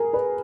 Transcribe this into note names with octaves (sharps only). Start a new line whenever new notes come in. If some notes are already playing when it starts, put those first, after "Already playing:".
Already playing: G#4 A#4
B4